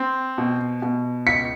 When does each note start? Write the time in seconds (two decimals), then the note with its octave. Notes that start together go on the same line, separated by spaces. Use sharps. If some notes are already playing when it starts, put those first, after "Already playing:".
Already playing: C4
0.38 B2
0.82 B2
1.27 C#2 B6 C#7